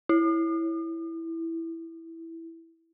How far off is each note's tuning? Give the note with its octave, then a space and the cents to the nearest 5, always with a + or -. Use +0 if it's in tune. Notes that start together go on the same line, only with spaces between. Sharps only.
E4 +0